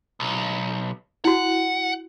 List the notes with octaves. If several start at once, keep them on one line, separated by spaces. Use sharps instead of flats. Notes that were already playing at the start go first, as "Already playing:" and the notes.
B1
E4 F#4 F#5